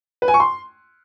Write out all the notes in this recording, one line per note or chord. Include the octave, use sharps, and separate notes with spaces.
B4
G#5
C#6
C6